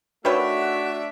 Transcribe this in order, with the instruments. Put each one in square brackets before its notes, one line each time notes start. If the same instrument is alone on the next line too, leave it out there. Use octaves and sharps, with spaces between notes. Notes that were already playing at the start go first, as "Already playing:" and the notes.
[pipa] D#3 B4 G5 [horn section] A3 D4 E5 [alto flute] F#4 [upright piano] C#5